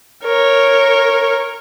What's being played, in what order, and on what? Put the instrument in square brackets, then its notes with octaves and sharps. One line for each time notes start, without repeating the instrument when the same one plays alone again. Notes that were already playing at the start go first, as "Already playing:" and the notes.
[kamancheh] A#4 C#5